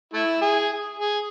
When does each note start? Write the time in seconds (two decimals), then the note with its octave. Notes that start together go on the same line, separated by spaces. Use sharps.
0.13 A3 E4
0.42 G#4
0.99 G#4